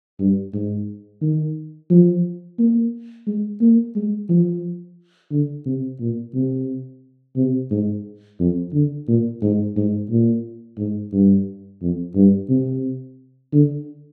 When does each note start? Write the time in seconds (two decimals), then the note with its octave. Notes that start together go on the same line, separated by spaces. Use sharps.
0.20 G2
0.54 G#2
1.22 D#3
1.91 F3
2.59 A#3
3.27 G#3
3.61 A#3
3.95 G#3
4.29 F3
5.32 D3
5.66 C3
6.00 A#2
6.34 C3
7.37 C3
7.71 G#2
8.40 F2
8.73 D3
9.08 A#2
9.43 G#2
9.77 G#2
10.11 A#2
10.78 G#2
11.13 G2
11.82 F2
12.15 G2
12.49 C3
13.53 D3